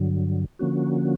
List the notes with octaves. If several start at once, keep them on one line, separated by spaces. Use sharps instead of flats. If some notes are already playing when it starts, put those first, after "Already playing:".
Already playing: G2 D3 F#3
D3 F3 A#3 C#4 F#4